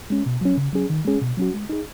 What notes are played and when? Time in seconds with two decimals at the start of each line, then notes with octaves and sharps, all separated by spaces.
0.10 G#3 C#4
0.26 B2
0.41 F#3 C#4
0.57 C#3
0.73 F#3 C#4 G#4
0.90 D#3
1.05 G#3 C#4 G#4
1.21 B2
1.37 F#3 C#4 F#4
1.54 G#3
1.69 D#4 G#4